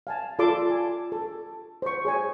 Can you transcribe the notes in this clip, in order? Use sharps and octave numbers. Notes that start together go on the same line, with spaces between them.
F5 G#5 A5
F4 A4 D5 A5 C6 D6
G#5
A4
C5 C#6
G#4 C#5 G#5